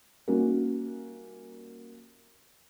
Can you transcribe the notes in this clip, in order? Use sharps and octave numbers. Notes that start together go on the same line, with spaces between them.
G3 A#3 C#4 D#4 F#4 A#4